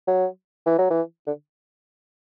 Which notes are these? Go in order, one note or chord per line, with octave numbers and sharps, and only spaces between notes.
F#3
E3
F#3
E3
D3